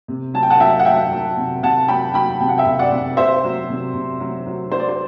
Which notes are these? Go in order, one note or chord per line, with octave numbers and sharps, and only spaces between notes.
C3
F#3 A5
G5
F#5 A5
F#3 E5 G5
F#5
F#3 E5 G5
F#3
C3
C3 F#5 A5
F#3 G5 B5
F#3 G5 B5
C3 G5
F#5
E5 G5
C3
D5 F#5
C3
C3 C5 E5
F#3
C3
C3
F#3
F#3
F#3 C5
D5
C5